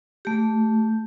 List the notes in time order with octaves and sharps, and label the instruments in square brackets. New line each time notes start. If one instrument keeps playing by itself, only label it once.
[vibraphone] A3 G4